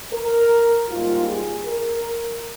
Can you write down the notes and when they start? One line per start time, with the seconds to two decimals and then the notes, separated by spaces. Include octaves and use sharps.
0.12 A#4
0.89 G#2 G3 A#3 F4
1.27 G#4
1.65 A#4